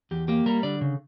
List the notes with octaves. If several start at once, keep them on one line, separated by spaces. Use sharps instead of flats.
E2 G4
A#3 G4
G3 A#4
D3 D5
C#3